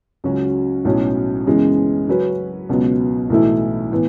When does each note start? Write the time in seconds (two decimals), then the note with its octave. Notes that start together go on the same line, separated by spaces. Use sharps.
0.24 C#2 C#3 F#3 C#4 F#4
0.85 B1 A2 F#3 C#4
1.46 F#2 C#3 E3 G#3 B3
2.08 C#3 F#3 C#4 F#4 B4
2.69 C#2 B2 F#3 B3
3.30 B1 A2 E3 A3 E4
3.92 A2 E3 B3